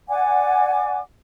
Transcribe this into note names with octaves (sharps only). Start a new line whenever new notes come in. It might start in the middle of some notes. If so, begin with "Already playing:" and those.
D5 F#5 G#5 D6